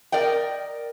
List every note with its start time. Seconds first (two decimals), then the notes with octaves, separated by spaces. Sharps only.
0.12 A#4 D5 D#5 G5